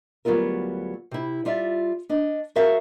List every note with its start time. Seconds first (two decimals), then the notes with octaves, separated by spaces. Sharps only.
0.25 D2 F#3 G3 B3 F4 A#4
1.11 C3 E4
1.45 G3 F4 D5 E5
2.09 D4 D#5
2.56 F#4 G#4 A#4 E5 F5